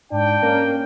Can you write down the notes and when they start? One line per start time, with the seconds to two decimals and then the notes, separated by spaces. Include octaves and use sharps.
0.11 G#2 D4 G5
0.42 A#3 C#4